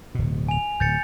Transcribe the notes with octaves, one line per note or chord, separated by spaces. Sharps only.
D1 B2
G#5 F7
D1 G6 A6 C#7